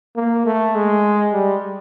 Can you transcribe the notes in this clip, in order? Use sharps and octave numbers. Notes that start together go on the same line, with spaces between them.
A#3
A3
G#3
G3